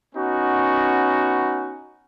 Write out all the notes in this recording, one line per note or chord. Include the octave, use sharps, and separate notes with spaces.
B3 C#4 D#4 F#4